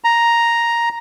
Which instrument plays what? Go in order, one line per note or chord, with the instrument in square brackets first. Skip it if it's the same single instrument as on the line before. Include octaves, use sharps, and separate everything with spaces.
[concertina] A#5